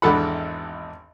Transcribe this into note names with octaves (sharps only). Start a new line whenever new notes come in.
G#1 E2 D4 A4 F#5 B5